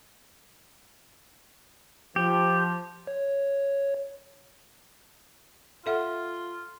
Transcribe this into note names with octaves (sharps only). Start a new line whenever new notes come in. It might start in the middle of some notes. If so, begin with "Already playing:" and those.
F3 G4
C#5
F4 A4 E5 F#5